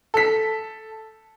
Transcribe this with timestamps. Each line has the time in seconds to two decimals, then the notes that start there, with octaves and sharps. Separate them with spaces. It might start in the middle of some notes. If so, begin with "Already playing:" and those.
0.14 A4 B6